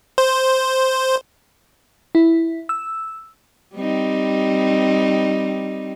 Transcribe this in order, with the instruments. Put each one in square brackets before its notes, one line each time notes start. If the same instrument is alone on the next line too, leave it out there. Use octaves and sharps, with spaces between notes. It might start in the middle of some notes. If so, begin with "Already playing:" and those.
[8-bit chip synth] C5
[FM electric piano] E4
E6
[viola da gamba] G3 C4 D#4